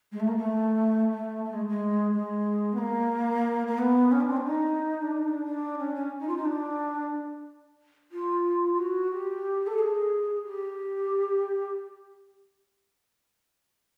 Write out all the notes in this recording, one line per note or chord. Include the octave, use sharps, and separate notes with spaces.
G#3
A3
A#3
A3
A3
A3
G#3
G#3
G#3
B3
A#3
A#3
B3
C#4
D4
C4
D4
D#4
D4
D#4
D4
D4
C#4
C#4
D#4
F4
D#4
D4
F4
F4
F#4
G4
A4
G#4
G4